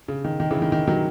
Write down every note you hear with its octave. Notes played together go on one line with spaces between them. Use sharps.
C#3
D#3
D#3
C#3 E3
D#3
D#3
D#3 F#3